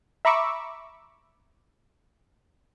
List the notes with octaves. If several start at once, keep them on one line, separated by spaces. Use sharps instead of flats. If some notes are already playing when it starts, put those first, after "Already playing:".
E5 A#5 B5 C#6 D6 E6